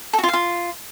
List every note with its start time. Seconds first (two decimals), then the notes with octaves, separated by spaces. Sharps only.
0.13 A4
0.18 F#4
0.23 F4
0.28 F5
0.34 F4